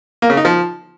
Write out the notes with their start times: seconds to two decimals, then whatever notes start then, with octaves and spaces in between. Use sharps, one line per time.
0.22 A#3
0.30 C#3
0.37 D#4
0.45 F3